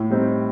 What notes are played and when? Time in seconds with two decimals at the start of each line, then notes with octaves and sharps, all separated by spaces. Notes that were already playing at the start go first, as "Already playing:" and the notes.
Already playing: A2
0.10 G3 C4 D#4